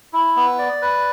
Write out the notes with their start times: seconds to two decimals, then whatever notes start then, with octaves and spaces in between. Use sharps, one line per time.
0.13 E4
0.36 B3
0.59 D5
0.82 B4